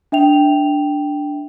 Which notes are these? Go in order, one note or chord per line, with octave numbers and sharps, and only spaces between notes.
D4 E5 G5 F7